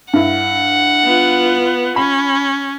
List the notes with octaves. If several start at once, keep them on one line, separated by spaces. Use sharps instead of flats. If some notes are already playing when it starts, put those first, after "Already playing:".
G2 E4 F#5
B3 F4
C#4 B5